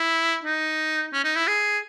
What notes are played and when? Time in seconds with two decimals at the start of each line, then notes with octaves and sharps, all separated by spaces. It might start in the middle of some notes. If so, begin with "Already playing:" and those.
Already playing: E4
0.44 D#4
1.13 C#4
1.24 D#4
1.36 E4
1.48 G#4